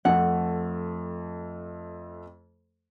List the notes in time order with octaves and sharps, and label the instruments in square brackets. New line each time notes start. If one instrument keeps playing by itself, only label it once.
[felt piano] F2 A3 [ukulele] F#5